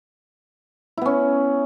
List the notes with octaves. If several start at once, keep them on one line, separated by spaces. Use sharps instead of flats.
B3 C#4 E4